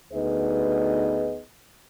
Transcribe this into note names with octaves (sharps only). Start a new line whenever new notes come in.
D2 B3 D#4 G#4 B4 D#5